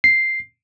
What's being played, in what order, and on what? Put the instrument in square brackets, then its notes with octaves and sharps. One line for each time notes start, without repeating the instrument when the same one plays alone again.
[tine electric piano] C7